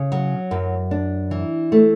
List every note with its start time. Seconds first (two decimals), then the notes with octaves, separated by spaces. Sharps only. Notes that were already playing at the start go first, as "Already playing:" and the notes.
Already playing: C#3
0.12 F#3
0.51 F#2
0.91 D4
1.31 E3
1.72 A3